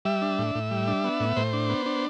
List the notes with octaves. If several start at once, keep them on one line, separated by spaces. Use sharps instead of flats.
G3 E5
D4
A2
A2
G3
D4
B3
A2
A2 C5
D4
B3
D4